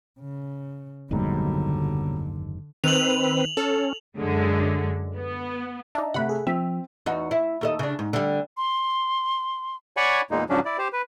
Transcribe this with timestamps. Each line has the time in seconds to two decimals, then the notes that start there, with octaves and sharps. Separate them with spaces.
0.20 C#3
1.11 F#1 D#2 G#2 B2 D3 F#3 G3
2.84 D#3 C4 B4 F7 F#7
3.57 C#4 A4
4.18 F#2 D3 G#3
5.15 B3
5.95 D4 D#4 E5 A5 A#5
6.14 C3 A3 F#5 B5
6.29 G#4 A4 E5
6.47 F3 C4 E5
7.06 E2 D#4 F#4
7.31 E4
7.61 D#2 A4 D#5
7.79 C#3 D4
7.99 G#2
8.13 D3 G3
8.57 C6
9.97 C#5 D5 F#5 G#5 B5 C#6
10.31 E2 A#2 G#3 A#3 D#4
10.50 G#2 C#3 F3 F#3 C#4 D4
10.65 E4 D5
10.78 G4 C5
10.93 B4